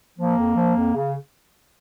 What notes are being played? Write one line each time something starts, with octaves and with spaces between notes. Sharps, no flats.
F3 A#3
F2
F3
F2
C#3